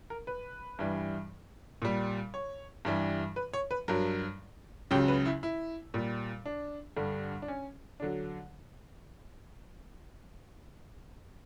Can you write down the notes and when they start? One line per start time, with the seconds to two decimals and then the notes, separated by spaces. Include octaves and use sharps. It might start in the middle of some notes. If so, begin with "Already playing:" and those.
0.10 A#4
0.27 B4
0.79 G2 E3 G3
1.82 A#2 G3
2.34 C#5
2.85 G2 E3 G3
3.36 B4
3.53 C#5
3.71 B4
3.88 G2 F#3 A#4
4.91 C#2 C#3 F#3 G4
5.08 B4
5.25 E4
5.43 E4
5.94 A#2 G3
6.46 D4
6.96 G2 D3 G3
7.42 D4
7.48 C#4
8.00 D4
8.02 D3 F#3